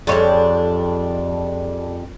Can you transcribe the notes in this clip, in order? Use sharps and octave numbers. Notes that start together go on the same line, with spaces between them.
F2 G3 G#3 D4 C#5